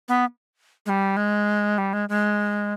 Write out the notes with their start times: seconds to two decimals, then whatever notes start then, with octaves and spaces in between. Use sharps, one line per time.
0.08 B3
0.86 G#3
0.89 G3
1.17 G#3
1.78 G3
1.93 G#3
2.09 G#3